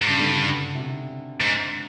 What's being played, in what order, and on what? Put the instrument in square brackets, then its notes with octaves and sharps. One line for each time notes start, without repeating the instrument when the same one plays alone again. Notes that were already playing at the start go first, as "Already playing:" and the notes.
[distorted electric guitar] G#2
[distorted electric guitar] G2 [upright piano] C#3
[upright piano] D3
C#3
C3
[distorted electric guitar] G#2